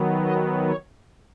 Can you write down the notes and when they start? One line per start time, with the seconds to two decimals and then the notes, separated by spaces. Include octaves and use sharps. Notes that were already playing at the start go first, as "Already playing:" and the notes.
Already playing: D#3 F#3 B3
0.22 D#5
0.64 C#5